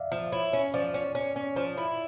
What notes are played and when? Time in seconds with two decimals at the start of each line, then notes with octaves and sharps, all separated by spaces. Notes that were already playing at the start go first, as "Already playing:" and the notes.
Already playing: D5 E5 F5
0.12 F3
0.32 E4 C#5
0.53 C#4
0.74 F3 D5
0.94 C#4
1.15 C#4
1.36 C#4
1.56 F3
1.78 E4